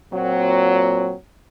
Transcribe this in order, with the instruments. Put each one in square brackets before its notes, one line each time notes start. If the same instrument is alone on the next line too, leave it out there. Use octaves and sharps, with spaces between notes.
[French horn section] A#2 F#3 C4